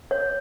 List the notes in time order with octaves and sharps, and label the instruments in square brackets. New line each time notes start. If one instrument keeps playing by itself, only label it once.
[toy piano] C#5